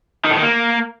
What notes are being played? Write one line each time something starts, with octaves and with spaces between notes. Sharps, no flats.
D#3
A2
D#3
A#3